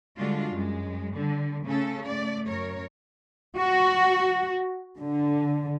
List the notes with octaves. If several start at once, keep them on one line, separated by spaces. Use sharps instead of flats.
D3 G3 G#3 D4 F4 F#4
F#2 G#3
D3 G3
C#3 A3 C#4 A4
A3 D5
F#2 A#4 C#5
F#4
D3